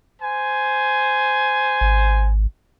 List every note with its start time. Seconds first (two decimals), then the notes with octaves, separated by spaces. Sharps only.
0.22 C5 G#5
1.81 G#1